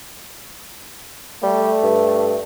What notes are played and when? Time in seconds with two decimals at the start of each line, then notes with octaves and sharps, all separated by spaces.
1.43 G3 A3
1.84 G2